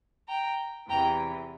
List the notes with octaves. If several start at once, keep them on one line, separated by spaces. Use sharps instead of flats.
G5 A#5
E2 C3 E3 G5 A#5